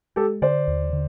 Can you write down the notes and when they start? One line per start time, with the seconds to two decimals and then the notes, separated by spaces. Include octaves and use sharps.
0.16 G#3 G4 A4
0.42 D3 C5 D5
0.68 D#2
0.93 D3